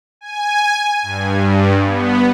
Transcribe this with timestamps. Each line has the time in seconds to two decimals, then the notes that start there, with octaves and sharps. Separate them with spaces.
0.21 G#5
1.03 G2
1.86 B3